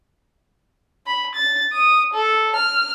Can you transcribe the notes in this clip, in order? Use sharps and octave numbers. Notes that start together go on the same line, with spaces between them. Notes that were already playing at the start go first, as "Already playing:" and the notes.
B5
A6
D#6
A4
F6